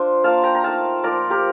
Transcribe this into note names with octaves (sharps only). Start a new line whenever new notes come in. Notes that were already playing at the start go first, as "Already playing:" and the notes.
Already playing: D4 F4 C5
A#3 F4 F5 A5
G5 A#5
A#5
A3 D#4 F5 A5
F3 A#3 F4 A#4 D5
G4 A#4